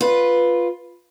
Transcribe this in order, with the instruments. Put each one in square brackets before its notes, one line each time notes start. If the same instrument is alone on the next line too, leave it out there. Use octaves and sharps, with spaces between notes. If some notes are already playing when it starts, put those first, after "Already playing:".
[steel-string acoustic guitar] F4 B4